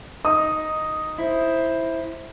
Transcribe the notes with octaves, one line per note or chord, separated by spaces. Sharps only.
D#4 D#6
E4 C5